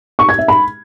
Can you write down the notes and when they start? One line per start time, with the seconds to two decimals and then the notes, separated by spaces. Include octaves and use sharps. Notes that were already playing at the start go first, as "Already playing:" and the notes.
0.19 C#6
0.29 G#6
0.39 E5
0.48 B5